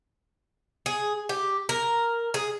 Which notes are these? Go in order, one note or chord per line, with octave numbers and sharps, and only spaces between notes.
G#4
G4
A#4
G#4